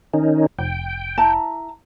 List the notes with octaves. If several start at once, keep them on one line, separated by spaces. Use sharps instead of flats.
D#3 C#4 D#4
F1 G5
E4 A5 A#5